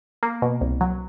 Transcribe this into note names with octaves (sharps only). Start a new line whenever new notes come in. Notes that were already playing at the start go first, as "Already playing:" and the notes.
A#3
B2
C2
F#3